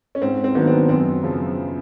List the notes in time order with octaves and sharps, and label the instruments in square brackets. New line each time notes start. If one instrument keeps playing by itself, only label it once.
[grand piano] C#4
[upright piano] G#2 [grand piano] C4
[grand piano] C4
[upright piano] D#3 F#3 A#3 D4 [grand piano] B3
[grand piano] C4
[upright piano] F#2 [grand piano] C4
[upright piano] C#3 F3